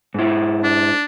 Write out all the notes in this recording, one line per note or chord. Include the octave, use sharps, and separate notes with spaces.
G#2 E4
D4